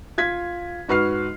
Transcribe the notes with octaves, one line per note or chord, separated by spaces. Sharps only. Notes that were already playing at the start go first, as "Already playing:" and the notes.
F4 G#6 B6
G#2 F#4 B4 F6 C7